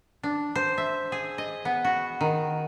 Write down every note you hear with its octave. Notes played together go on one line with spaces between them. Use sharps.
D4
C5
E5
G#4
D#5
B3
F#4
D#3